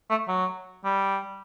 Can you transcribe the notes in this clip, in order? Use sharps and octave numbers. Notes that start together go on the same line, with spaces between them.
A3
F#3
G3